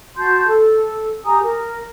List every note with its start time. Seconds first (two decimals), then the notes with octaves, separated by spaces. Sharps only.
0.17 F#4 A5 C6 G6
0.46 A4
1.24 G4 G#5 A#5 D#6
1.42 A#4